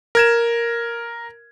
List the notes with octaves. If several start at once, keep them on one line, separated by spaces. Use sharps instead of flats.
A#4 G#6 E7